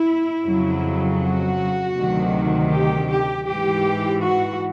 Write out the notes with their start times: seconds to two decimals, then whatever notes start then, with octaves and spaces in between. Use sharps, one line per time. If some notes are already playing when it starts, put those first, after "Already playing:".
Already playing: E4
0.44 F2 C#3 F#3
1.20 F#4
1.95 D2 C3 D#3 F#3
2.71 G4
3.09 G4
3.47 G#2 E3 G4
4.23 F#4